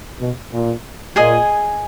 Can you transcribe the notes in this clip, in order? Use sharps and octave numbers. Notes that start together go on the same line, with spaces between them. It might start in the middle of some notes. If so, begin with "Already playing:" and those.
B2
A#2
A#2 G#4 D#5 G#5